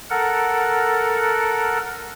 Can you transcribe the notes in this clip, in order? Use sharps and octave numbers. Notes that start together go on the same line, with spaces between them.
A4 A#4 F#5